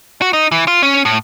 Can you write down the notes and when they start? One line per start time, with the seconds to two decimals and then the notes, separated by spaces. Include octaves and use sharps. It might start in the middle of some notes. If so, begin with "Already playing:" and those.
0.22 F#4
0.33 D#4
0.52 E3
0.68 F4
0.83 C#4
1.05 A2